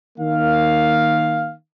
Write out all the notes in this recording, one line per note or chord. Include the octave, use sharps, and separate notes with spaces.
D#3 A#3 F5